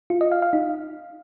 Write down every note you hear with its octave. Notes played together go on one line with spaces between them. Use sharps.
F4
D#5
F5
F5
D#4